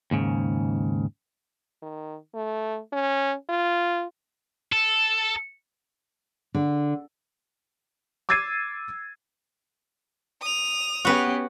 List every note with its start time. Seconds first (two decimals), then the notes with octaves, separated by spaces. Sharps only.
0.11 D#2 G#2 C#3
1.82 D#3
2.34 A3
2.92 C#4
3.49 F4
4.72 A4
6.55 D3
8.29 D6 E6 G#6 A6 C7 D#7
10.42 D#6 F7
11.05 B3 C#4 F#4 G4 B4